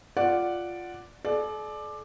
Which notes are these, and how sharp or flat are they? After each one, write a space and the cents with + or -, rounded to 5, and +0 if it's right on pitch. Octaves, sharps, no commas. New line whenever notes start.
F4 +0 D5 +0 F#5 +5
A4 -45 D5 +15